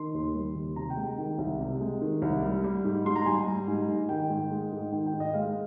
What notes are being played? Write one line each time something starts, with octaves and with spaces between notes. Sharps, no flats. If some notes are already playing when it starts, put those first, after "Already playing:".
Already playing: D#3 C6
D#2
G3
D#2
C3 A#5
G5
G#3
G5
D#3
C2
C3
G#3
D#3
C2
G3
G3
G#2
G#2 C6
A#5
G3 G#5
G3
G#2
G#2
D#3 G5
G#2
G#3
G#2
D#3 G5
G5
G#2
D#5
G#3 F5